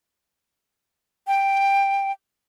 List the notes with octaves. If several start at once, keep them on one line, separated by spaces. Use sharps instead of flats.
G5